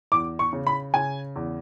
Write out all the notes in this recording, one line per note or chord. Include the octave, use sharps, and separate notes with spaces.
E2 D6
C#6
C#3
B5
C#3 G#5
E2